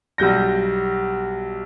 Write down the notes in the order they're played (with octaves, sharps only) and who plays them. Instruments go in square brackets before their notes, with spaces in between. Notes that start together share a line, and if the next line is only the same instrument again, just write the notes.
[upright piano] B1 G3 G6 A#6